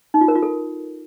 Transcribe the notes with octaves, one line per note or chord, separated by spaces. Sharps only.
D#4
F4
A#4
F4
A4